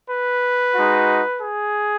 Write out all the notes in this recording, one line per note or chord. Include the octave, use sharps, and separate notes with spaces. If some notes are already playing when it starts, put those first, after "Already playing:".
B4
G#3 D#4 F#4
G#4